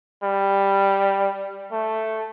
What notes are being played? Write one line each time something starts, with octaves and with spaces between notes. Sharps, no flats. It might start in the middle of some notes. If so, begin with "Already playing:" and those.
G3
A3